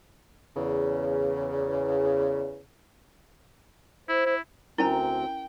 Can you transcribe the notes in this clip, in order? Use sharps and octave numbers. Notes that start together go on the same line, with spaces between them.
E2 C#3
E4 C5
E4
D2 C4 C#4 E4 A#4 G5 G#5 A#5